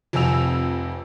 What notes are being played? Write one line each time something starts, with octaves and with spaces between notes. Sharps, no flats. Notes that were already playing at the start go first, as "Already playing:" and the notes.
F1 F2 C3 G#5 E6 F7